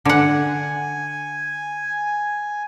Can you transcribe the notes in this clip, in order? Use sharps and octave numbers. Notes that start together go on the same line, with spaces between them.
D3 F#5 G#5